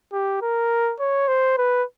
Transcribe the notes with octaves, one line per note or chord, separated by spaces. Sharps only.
G4
A#4
C#5
C5
B4